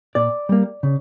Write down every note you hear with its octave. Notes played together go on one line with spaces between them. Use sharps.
A#2 D5
G3 A#3
C#3